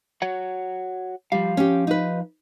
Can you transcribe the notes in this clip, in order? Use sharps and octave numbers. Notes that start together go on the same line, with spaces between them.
F#4 C#5 F#5
F3 G3 F5
C#4 G4
D#4 B4